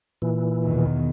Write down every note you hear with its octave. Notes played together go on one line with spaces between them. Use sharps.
A#2 E3
E2 B2 D#3